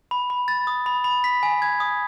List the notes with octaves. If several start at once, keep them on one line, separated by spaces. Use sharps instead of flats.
B5
B5
A6
D#6
B5
B5
B6
G#5
G#6
D#6